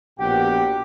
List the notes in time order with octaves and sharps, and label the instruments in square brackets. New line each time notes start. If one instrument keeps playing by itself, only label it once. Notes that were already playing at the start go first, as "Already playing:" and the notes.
[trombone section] A#1 B2 [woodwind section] G4 [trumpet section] F#5 G5